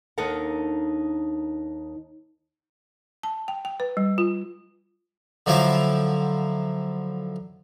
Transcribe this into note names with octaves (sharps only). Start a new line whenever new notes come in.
D#2 D4 D#4 A4 A#4 F#5
A5
G5
G5
B4
G3
F4
D3 F3 F#3 E4 F4 G5